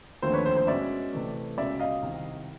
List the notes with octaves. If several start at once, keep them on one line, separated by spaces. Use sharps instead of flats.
D#2 D3 F3 A3 C4 C5
B4 C#5
C5
C5
B2 G#3 C#4 D5 E5
C3 E3 A3
C#2 B2 G#3 C#4 D5 E5
D#5 F5
C2 C3 D#3